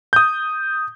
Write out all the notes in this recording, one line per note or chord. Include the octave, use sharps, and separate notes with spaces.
D#6 G6